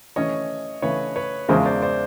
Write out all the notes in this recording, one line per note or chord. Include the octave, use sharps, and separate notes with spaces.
E3 A3 C#4 C#5 D#5
C#3 E3 A3 B4 C#5
B4 C#5
E2 C#3 F3 G#3 A#4 C5
C5 D5
C5 D5